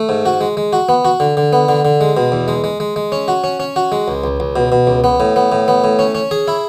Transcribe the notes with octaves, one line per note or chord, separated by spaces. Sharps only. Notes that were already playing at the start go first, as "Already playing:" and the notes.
Already playing: A3
G#2
F#4
G#3
G#3
F#4
B3
F#4
D3
D3
B3
D3
D3
G#3
B2
E2
G#3
G#3
G#3
G#3
C#4
F#4
C#4
C#4
F#4
G#3
C#2
C#2
C#2
B2
B2
C#2
B3
A2
B3
A2
B3
A2
C#4
C#4
G#4
E4